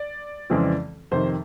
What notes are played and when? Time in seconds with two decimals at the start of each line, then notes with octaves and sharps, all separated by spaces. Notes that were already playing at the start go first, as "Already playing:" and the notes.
Already playing: D5
0.50 F2 C#3 E3 G#3 C4
1.11 F2 C3 D#3 C5